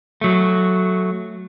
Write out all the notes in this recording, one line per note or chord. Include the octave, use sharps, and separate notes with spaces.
F#3 A3